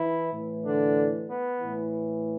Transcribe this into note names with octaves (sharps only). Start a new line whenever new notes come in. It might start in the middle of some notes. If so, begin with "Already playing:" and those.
Already playing: E3 E4
A2 E3
D3 D4
B3
A2 E3